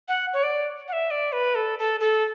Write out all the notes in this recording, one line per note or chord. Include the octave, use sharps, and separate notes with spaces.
F#5
C#5
D5
F#5
E5
D5
B4
A4
A4
A4